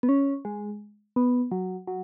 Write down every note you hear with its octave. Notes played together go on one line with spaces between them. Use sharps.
B3
C#4
G#3
B3
F#3
F#3